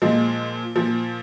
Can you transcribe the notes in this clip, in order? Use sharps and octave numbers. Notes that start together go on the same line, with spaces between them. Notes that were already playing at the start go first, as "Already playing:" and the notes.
A#2 F3 G#3
A#2 F3